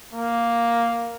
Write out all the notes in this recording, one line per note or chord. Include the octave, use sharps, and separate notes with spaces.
A#3